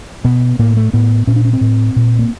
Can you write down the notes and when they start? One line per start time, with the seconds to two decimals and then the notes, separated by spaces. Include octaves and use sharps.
0.25 B2 B3
0.59 A2 A#3
0.77 A3
0.93 A2 B3
1.27 A#2 C#4
1.36 D4
1.45 C#4
1.53 C4
1.61 A2
1.96 A#2
2.19 A#3